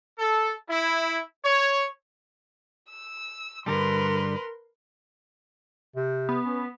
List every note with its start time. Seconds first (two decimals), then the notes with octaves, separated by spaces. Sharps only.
0.19 A4
0.70 E4
1.45 C#5
2.89 E6
3.66 G2 D3 G3 A#4 B4 C6
5.96 C3
6.29 B3
6.45 C#4